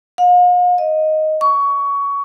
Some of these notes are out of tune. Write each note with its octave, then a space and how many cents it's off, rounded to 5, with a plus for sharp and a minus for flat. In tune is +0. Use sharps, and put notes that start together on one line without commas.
F5 +45
D#5 +0
C#6 +20